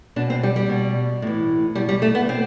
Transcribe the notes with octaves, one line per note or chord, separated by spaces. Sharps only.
B2 D4
C4
G3
G3
B2
A2 E3
B2 G3
G3
A3
B3
B2 C4